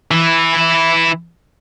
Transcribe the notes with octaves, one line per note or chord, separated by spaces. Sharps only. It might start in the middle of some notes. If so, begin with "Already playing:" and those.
E3 E4